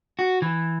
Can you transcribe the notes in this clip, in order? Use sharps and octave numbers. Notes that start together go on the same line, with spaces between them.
F#4
E3